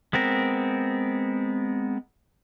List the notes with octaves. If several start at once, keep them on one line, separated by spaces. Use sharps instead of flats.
G#3 B3 C4 A#4